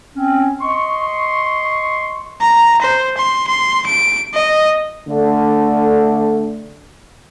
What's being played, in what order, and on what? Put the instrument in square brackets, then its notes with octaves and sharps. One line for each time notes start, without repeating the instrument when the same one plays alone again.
[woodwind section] C4 C#4
D#5 C6 C#6
[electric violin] A#5
C5
C6
C6
D7
D#5
[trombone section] D3 A3